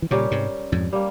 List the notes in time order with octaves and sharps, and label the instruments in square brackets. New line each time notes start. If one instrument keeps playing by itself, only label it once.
[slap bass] E3
[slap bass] A#2 C#3 [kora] G3 C#4 G4 A#4
[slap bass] G#2 C3
F2 G#2
[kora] G3 A#3